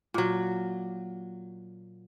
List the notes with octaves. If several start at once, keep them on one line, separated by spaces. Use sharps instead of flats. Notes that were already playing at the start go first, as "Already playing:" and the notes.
A#2 F#3